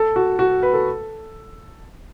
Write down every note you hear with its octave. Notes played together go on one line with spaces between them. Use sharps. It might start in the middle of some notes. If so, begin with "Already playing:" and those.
Already playing: A4
F#4
F#4
B4
A4